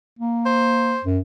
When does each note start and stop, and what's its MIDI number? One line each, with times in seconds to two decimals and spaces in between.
0.19 0.95 58
0.46 1.02 72
1.04 1.19 42